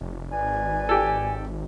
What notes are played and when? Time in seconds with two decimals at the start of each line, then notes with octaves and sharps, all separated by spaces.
0.01 F1
0.32 G#1 B4 D5 G#5
0.89 G4 A4